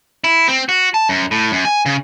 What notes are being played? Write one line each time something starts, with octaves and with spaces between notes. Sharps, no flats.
E4
C4
F#4
A5
F#2
A2
F#2
G#5
C#3